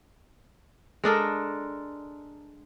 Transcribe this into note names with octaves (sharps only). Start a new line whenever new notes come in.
G#3 D4 A4 A#4